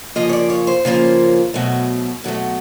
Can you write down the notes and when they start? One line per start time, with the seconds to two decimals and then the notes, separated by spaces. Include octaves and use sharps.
0.15 C#3 F3 A#3 C#4 F4 D#5
0.29 C#5
0.33 D5
0.50 C#5
0.67 C5
0.85 C#3 F3 A#3 C#4 F4
1.54 B2 F#3 A3
2.24 B2 F#3 A3